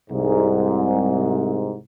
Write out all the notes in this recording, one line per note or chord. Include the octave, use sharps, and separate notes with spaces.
C2 G#2